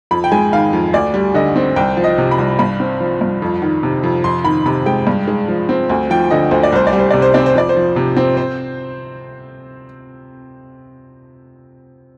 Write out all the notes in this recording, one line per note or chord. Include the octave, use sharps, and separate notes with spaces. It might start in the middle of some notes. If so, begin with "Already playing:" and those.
F2 B5
G5
G#3 G#5
D#3 F5
F2
D2 D5
G3
D3 D#5
C4
C2 G5
F3
D#5
C3
B5
C2
G2 B5
C4
F3
G2
F2
D#3
C3
F2
F2 C6
D#3 B5
C3 B5
G#3 G5
G2
G#3
F3
C4
D2
F3 G5
D3 D#5
D2 C5
D5
C2 C5
D5
G3
C5
C3 D5
C5
C4 D5
C5
F2 D5
C5
F3
C3
C4
C5